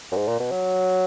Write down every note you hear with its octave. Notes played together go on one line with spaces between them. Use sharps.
F#2
G#2
A#2
B2
F#3